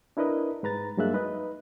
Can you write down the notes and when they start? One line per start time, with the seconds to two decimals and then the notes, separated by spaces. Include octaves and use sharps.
0.17 D4 E4 A#4 B4 D#5
0.63 G#2 B4 A#5 A6
0.97 G2 F#3 G#3 A#3 E5 F#6
1.13 D#4 B4 D#5